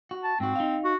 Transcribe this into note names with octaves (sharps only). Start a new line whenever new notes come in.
F#4
A5
G#2 C4 F#4
D#4 F5
F#4